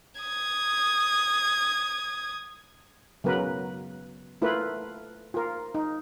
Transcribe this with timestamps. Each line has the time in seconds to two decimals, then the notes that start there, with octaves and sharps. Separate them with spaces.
0.21 D#6 G#6
3.24 C#3 F#3 B3 A#4 B4
4.42 A3 E4 F4 A#4 B4
5.34 F4 A#4
5.75 D#4